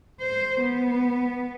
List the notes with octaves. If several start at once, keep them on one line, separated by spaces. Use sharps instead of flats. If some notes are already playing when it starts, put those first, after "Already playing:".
C5
B3